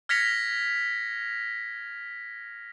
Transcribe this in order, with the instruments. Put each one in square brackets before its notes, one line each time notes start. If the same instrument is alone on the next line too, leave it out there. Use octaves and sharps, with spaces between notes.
[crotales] F6 G#6 A#6 B6 C#7 F7